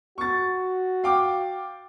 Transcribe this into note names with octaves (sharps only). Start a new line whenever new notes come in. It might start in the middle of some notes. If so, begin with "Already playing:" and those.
F#4 C#6 A6
F5 G5 D6